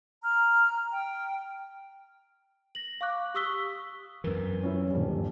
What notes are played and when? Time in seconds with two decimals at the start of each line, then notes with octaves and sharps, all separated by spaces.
0.23 A#5 F6
0.92 G5
2.75 A#6 F#7
3.01 F5 C#6 D6 F#6
3.34 G4 C#6 D#6 E6 B6 G7
4.24 F#2 E3 A#4
4.63 C#4 E4
4.91 D#1 G2